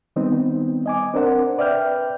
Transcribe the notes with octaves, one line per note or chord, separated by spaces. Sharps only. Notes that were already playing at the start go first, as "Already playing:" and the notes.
D#3 G3 B3 C4 D#4
D#5 G#5 D6
C4 D4 A#4 C5 F#5
B4 D5 E5 G5 F6 G6